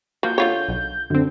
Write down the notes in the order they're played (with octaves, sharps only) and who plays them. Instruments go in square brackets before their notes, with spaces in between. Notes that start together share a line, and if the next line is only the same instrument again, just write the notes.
[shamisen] F3 [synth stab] A#3 F#4 [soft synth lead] G6
[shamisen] D3 F4 C#5
[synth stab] B1
[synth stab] F#2 C4 [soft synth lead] D3